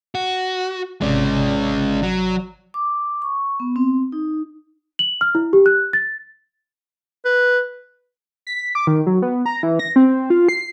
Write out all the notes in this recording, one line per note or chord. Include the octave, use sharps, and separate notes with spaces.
F#4
G#1 C3 G#3 C#4 D5
F#3
D6
C#6
B3
C4
D#4
F#7
F6
E4
G4
F#6
A6
B4
B6
D6
D#3
F#3
B3
A#5
E3
A#6
C4
F4
C7